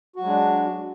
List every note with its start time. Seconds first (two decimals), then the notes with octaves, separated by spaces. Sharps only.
0.16 F#4
0.20 F#3
0.24 G#3
0.28 D4